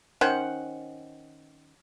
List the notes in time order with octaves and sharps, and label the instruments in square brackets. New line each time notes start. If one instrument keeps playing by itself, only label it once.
[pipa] D#3 C#4 C5 F#5